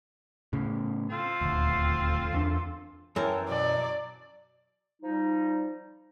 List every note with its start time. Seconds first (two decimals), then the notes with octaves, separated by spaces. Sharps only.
0.53 A2 C#3
1.10 C4 F4 A4
1.41 D#1 D2
2.33 E2 B3 D4
3.16 F#2 E3 A#4 C#5 G5 A5
3.49 B2 F#3 D5
5.03 F3 G3 D#4